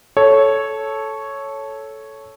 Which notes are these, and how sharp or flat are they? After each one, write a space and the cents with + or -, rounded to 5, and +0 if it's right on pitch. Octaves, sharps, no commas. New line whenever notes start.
A4 -10 C#5 +0